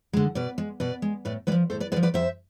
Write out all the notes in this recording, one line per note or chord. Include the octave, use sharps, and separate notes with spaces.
D3 G#3
B2 B4 D5
G#3
B2 B4 D5
G#3
A2 B4 D5
G#3 B4 D5
F3
A2 A4 C5
B4 D5
G#3 B4 D5
F3
B4 D5
F2 C5 E5